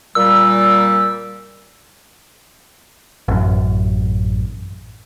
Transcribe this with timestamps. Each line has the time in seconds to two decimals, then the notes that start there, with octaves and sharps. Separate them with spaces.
0.15 A#2 G3 E6
3.28 A1 F#2